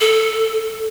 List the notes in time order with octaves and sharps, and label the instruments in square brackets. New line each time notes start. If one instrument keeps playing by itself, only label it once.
[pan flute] A4